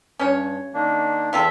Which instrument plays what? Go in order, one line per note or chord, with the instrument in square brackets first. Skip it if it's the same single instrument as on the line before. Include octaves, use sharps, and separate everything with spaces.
[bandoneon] G2 [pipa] C#4 C#5
[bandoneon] D#3 A#3 D4
[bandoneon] E2 E5 [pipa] C3 F4 A4